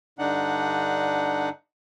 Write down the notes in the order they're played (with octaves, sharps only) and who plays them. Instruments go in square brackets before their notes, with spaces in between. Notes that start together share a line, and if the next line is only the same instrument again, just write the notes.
[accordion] G2 D3 D4 D#4 F#5